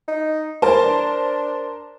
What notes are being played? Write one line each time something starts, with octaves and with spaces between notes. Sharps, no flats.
D#4
E3 A#4 C5 A5
D4